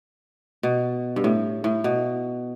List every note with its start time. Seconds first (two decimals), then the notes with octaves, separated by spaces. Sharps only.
0.63 B2
1.16 G2
1.24 A2
1.64 A2
1.84 B2